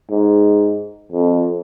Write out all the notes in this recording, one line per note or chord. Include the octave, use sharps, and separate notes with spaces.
G#2
F2